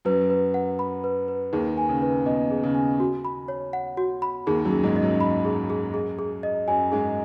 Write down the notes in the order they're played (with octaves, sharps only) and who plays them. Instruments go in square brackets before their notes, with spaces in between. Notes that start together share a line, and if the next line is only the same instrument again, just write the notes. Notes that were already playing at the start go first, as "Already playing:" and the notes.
[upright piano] F#2 F#3 [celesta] B4
[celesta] B4
F#5
B5
B4
B4
[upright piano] D#2 D#3 [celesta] G#4
[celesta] G#5
[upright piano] C#3
[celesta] B4
[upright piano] B2 [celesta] D#5
[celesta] G#4
[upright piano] C#3
[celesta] G#5
F#4
B5
C#5
F#5
F#4
B5
[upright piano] D#2 D#3 [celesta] G#4
[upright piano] F#2 F#3
[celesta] G#4
[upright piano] G#2 G#3
[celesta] D#5
[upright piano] F#2 F#3
[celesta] B5
G#4
G#4
G#4
G#4
D#5
[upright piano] F#2 F#3 [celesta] G#5
[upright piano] G#2 G#3 [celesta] G#4